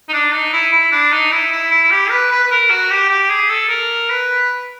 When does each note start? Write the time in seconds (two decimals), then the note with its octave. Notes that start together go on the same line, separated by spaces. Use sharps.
0.09 D#4
0.13 D4
0.33 D#4
0.53 E4
0.73 E4
0.92 D4
1.12 D#4
1.31 E4
1.52 E4
1.71 E4
1.91 G4
2.10 B4
2.31 B4
2.44 B4
2.51 A#4
2.70 F#4
2.91 G4
3.09 G4
3.29 G#4
3.50 A4
3.69 A#4
4.09 B4